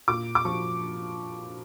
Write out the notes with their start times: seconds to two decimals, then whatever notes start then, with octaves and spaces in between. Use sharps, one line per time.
0.08 A#2 D6
0.35 D6
0.45 F3 C#6